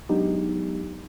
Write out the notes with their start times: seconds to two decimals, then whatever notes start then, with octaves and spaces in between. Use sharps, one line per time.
0.09 F#3 G#3 B3 D4 D#4 G4